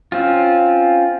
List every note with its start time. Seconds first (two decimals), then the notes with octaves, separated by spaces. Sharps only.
0.12 C4 C#4 F4